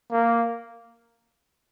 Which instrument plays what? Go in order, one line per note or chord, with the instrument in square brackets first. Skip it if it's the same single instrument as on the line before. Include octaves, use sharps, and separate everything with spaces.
[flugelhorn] A#3